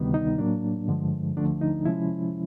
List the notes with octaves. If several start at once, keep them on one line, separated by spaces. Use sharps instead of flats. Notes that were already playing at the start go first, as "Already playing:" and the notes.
Already playing: D2 C3 D#3 G3 B3
D#4
A2 F#3 A#3 D4
G2 D3 F3 G#3
D2 D3 F3 A3 D4
D#4
C3 F3 G#3 C#4 E4